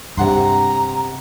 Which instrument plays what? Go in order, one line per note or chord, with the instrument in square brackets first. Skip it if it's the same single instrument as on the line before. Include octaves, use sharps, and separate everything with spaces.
[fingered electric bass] G2 [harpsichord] C3 F#5 C6 [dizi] A#5